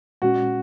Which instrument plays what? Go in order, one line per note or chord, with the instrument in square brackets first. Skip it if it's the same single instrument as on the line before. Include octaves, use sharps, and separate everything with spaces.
[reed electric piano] A#2 G#3 C#4 [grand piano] F#4